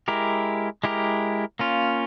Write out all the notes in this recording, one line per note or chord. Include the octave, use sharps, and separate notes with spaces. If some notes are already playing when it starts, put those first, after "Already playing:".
G#3 E4 G4 A#4
G#3 E4 G4 A#4
A#3 C#4 F4